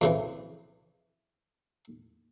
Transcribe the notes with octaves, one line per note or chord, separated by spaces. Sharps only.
F2 C#3 E3